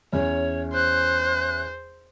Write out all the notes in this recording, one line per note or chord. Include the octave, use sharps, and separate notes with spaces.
E2 C#4 C#5
C5 F#6